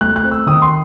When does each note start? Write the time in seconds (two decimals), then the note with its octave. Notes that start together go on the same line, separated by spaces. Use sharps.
0.01 A3 F#6
0.16 F#6
0.24 C4
0.31 E6
0.47 D#3 D#6
0.62 C6